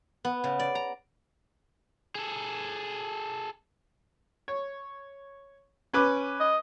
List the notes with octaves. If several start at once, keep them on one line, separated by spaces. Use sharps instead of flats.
B3
C#3
D5
A#5
G#4 A4
C#5
C#4 B4 D6
D#5